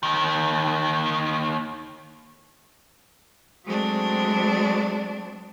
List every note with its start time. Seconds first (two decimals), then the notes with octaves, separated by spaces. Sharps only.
0.03 D#2 D#3
3.65 F#3 G#3 A3 C4 D4